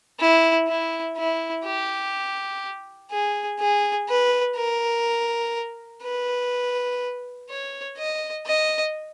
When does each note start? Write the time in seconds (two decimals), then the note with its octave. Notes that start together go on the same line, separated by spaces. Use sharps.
0.20 E4
0.68 E4
1.17 E4
1.65 G4
3.11 G#4
3.60 G#4
4.09 B4
4.57 A#4
6.03 B4
7.49 C#5
7.98 D#5
8.46 D#5